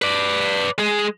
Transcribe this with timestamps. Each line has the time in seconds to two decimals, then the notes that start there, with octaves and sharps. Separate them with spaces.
0.02 B4 D5
0.78 G#3 G#4